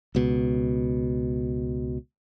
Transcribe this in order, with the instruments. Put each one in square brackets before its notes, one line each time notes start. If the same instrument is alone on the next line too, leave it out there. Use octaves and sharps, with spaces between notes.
[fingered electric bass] C#2 B2